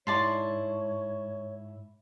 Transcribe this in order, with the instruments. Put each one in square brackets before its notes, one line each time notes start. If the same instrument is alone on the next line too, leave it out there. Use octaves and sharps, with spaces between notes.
[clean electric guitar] G#2 E4 [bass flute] C#5 [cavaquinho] D5 A5 C6